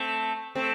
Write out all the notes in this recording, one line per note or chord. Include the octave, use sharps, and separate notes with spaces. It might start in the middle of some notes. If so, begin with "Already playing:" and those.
Already playing: A3 C4
A3 C4